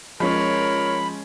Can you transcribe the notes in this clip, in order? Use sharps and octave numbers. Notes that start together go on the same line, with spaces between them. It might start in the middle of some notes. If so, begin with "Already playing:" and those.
F3 G#3 C#4 A#4 C#5 B5